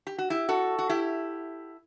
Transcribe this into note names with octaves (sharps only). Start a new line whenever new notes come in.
G4
F#4
E4 G4
F#4 A4
F#4
E4 G4